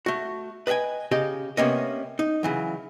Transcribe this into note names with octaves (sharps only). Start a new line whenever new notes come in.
A3 F#4
B4 D#5 E5 G5 G#5
C#3 G4 D#5
C3 A#3 B3 C#4 C#5 D#5
D#4
C#3 E3 F#3